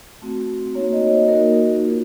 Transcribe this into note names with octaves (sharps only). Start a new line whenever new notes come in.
A3 C4 F#4
A#3 D#4 F#4 C#5
D#5
C5
A#3 D#4 F#4 A#4
A#3 F4